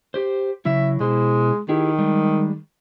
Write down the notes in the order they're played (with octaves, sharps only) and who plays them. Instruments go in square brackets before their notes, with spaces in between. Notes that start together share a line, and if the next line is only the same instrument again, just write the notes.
[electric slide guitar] G4 C5
[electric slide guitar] C#3 F#3 E4 [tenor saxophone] E5
[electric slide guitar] B2 E4 C5 [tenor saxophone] G#3
[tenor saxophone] D#3 [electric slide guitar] E4 G4 G#4
[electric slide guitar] G3 G#3